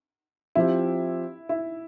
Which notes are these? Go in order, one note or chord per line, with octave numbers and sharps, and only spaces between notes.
F3 C4 E4 G4
E4